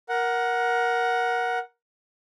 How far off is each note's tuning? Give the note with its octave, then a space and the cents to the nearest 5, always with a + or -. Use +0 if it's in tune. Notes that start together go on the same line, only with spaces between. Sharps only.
A#4 +15 F#5 +0